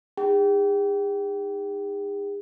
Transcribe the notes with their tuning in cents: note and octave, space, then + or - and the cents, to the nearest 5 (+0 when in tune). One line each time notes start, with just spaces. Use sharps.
D#4 +0 G#4 -45 G5 -25